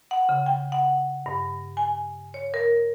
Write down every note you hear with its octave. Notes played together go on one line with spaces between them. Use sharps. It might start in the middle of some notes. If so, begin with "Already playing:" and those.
F#5
C#3
G5
F#5
G2
G#5
C#5
A#4